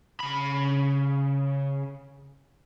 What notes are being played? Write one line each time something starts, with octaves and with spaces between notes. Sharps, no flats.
C#3 B5